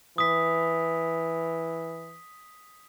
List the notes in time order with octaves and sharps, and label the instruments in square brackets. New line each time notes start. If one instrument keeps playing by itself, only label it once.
[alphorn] E3 [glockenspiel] D#6 B6